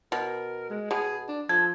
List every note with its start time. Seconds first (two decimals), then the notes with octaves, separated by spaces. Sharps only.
0.12 B2 A#4
0.70 G#3
0.91 B2 G#4
1.28 D4
1.49 F3 A4 G#6